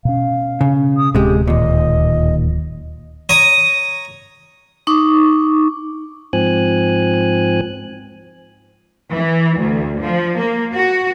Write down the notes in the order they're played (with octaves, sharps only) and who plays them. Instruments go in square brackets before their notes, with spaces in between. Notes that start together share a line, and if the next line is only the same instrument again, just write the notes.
[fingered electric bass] B2 C#4 [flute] F5
[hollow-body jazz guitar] C#3
[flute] D#6
[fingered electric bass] D1 [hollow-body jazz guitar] C3 G#3 [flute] G4
[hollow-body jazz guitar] D#2 A#2 [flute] D#5
[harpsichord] C#5 A#5 D#6
[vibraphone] D#4 C#6 D6
[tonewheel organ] G#2 F3 C4 G#5 F#6
[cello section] E3
D2
F3
A#3
F#4